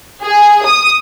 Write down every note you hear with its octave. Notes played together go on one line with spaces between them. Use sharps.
G#4
D#6